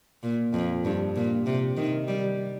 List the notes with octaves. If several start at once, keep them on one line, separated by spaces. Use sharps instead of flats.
A#2
F2
G2
A#2
C3
D#3
G3